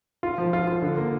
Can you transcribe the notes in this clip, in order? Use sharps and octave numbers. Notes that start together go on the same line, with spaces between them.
F4
F3
F4
F4
D3
A#3